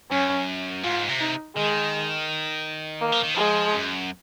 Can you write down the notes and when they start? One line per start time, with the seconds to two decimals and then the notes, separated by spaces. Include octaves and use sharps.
0.11 F#2 C#4
0.83 G#2 F4
1.09 C3
1.20 D#4
1.56 D#3 G#3
3.01 A#3
3.12 F3
3.24 D#3
3.35 F3 G#3
3.74 F#2